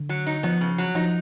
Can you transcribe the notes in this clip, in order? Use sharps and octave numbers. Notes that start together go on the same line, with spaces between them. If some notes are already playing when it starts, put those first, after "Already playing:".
Already playing: D3
F#3
D#4
F3 B3
C#3
F#3
F3 D#4